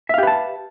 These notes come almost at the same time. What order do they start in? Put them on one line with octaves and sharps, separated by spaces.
E5 F5 G4 B4 A5